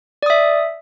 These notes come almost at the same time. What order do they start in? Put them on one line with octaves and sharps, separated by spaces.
D5 D#6 E5